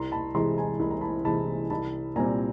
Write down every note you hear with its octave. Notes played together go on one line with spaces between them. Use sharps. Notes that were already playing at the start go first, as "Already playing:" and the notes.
Already playing: C2 A#5 C6
A5 B5
C3 E3 G#3 A#5 C6
G#5 A#5
C2 B5
A#5
A5 B5
C3 E3 G#3 A5 B5
C2 A5 B5
A#2 G3 C4 G#5 A#5